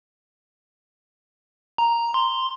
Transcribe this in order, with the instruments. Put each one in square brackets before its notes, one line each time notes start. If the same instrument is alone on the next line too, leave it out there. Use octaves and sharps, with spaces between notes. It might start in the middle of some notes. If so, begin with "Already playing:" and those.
[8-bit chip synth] A#5
C6